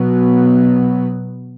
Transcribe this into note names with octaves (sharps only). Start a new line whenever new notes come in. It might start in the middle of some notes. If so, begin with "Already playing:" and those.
Already playing: B2 F#3 B3